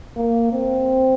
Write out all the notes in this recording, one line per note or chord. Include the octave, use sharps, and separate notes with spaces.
A#3
C4